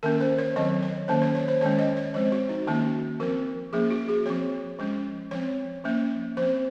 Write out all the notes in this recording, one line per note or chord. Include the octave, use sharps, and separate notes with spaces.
D#3 A#3 C#4 A#4
C5
C#5
D#3 F#3 C4 D#5
C#5
D#3 A#3 C#4 C5
C#5
C#5
C5
D#3 G#3 C#4 C#5
D#5
C#5
F3 G#3 C4 C5
F#4
D#4
D#3 A#3 C#4 F#4
F3 C4 A#4
F3 A#3 C#4 G#4
F#4
G#4
F3 C4 C#5
F3 G#3 C#4
F3 C4 C#5
F3 A#3 C#4
F3 C4 C5